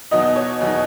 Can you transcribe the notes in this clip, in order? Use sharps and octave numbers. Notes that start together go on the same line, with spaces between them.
E2 B2 F#3 B3 D#4 D#5
C#5
E2 B2 F#3 B3 D#4